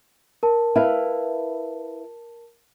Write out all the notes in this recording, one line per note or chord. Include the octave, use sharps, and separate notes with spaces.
A#4 A5
E4 B4 F5